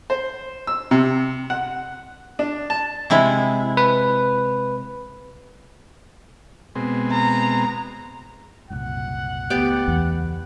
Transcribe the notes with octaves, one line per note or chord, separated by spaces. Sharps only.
C5
E6
C3
F#5
D4
A5
C3 G#3 E4
B4
B2 G#3 C4
A#5
F#1 C2 A#2 F#5
C#2 A3 B3 G4 D5
E2